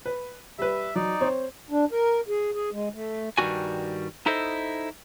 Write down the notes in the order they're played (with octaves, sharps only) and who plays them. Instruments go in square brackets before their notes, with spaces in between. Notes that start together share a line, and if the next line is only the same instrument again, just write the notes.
[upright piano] B4
[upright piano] G3 B4 [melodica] E5
[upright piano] F#3 [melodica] D#4 D5
[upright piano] C4 C5 C#5
[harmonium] D4
A#4
G#4
G#4
G#3
A3
[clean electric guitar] G2 D#3 G3 C#4 F#4 G#5
D#4 E4 A4 C5 D#5